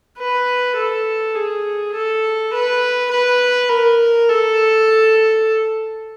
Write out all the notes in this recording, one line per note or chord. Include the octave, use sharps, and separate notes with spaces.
B4
A4
G#4
A4
B4
B4
A#4
A4